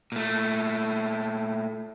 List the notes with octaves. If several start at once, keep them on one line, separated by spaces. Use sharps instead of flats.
A#2 A3